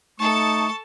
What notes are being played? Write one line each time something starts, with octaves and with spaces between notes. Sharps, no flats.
A3 D#4 A4 A5 C#6